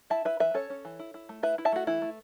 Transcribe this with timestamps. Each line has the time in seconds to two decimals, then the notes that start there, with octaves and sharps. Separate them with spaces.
0.10 E4 E5 A5
0.25 E4 B4 E5
0.40 E3 B4 E5
0.54 C#4 A4 C#5
0.70 C#4
0.85 E3
0.99 E4
1.14 E4
1.29 A3
1.43 E4 B4 E5
1.58 E4
1.65 E5 A5
1.72 A3 F#4
1.87 E3 E4
2.02 A3